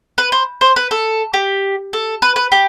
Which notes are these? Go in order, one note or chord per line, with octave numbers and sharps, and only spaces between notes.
B4
C5
C5
B4
A4
G4
A4
B4
B4
G4